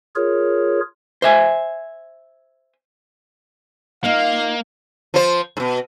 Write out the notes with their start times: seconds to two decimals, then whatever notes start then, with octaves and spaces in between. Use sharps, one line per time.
0.16 F4 G#4 A#4 C#5
1.22 C5 E5 G#5
4.04 A#3 D#4 F4 F5
5.14 F3 C5
5.57 G#2 B2